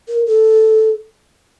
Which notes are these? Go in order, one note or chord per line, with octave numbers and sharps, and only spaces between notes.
A#4
A4